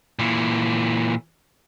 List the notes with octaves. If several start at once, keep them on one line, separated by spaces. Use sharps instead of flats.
A#2 E3